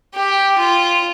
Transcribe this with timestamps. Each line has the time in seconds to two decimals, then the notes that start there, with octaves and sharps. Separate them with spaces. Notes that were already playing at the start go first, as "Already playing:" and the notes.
0.15 G4
0.59 F4